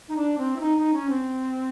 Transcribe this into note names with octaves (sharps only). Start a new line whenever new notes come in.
D#4
D4
C4
E4
D#4
D#4
C#4
C4